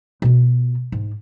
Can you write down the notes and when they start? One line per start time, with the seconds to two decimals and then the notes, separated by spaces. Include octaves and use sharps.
0.22 B2 F4
0.92 G#2